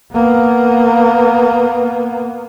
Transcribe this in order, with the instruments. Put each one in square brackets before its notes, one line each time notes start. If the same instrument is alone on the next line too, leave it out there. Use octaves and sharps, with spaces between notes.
[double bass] A#3 B3